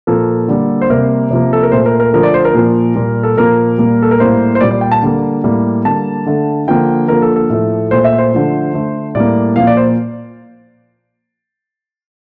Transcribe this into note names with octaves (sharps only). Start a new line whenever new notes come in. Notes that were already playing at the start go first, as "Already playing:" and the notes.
A#2 F3 A#3 A4
D3 G3 A#3
C5
C3 G3 A#3 A#4
C3 F3 A#3
A4
A#4
A#2 A3 C5
A#4
A#4
D3 F3 A3 A#4
D5
C5
A#4
A#2 F3 A#3
A#2 G3 A#3
A4
A#2 F3 A#3 A#4
A#2 G3 A#3
A4
A#4
A2 G3 A#3 C5
C5
A#2 G3 A#3 D5
D5
G5
A5
D3 G3 A#3
A2 G3 A#3
D3 G3 A#3 A5
D3 A3
D3 F3 A#3 G5
D3 F3 A#3 A#4
A4
A4
A2 F3 A3
A#2 A3 C5
E5
C5
D3 F3 A3
D3 A3
A2 G3 A#3 D5
A#2 F3 A#3 F5
D5
C5